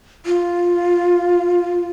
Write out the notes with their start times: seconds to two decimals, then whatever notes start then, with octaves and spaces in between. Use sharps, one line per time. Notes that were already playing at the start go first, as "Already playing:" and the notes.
0.26 F4